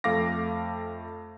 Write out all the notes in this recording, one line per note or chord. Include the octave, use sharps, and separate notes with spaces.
F2 A3 F5 D6 A#6